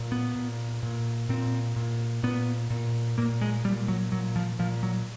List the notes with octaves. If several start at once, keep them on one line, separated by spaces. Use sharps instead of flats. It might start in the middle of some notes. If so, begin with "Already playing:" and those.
Already playing: A#2
B3
A#2
A#2
A#2 C4
A#2
A#2 B3
A#2
A#2 A#3
G#3
A#2 G3
F#3
A#2 F#3
F3
A#2 F3
F#3